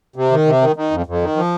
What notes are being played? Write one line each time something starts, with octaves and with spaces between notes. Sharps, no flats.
C3
D#3
C3
D#3
D#3
F2
F2
D#3
F3